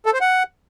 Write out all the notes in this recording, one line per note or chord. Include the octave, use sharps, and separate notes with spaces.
A4
C5
F#5